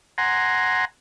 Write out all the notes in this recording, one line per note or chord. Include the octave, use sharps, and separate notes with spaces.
F#5 G#5 A#5 C6